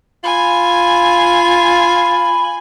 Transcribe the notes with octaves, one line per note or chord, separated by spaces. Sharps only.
F4 G#5 B5